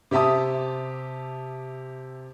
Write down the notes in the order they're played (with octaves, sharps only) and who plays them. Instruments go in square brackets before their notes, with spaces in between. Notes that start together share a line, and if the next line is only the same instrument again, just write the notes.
[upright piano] C3 G4 E5 A5 D#6